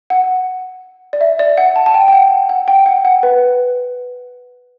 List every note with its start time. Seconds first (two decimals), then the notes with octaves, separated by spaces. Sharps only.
0.10 F#5
1.13 D5
1.21 E5
1.39 D5
1.58 F#5
1.76 A5
1.86 A5
1.94 G5
2.08 G5
2.12 F#5
2.49 F#5
2.68 G5
2.86 F#5
3.05 F#5
3.23 B4